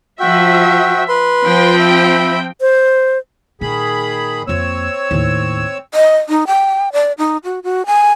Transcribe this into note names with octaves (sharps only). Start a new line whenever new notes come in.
F3 F#4 E5 G5
B4 C6
F3 C4 G5
E5 B5
C5
A#2 D#3 G#4 B5
F2 A#3 C4 C#5 E6
D#2 A2
D#5
D#4
G5
D5
D#4
F#4
F#4
G#5